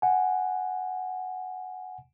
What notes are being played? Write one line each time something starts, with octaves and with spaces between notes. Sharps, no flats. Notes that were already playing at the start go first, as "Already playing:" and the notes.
F#5 G#5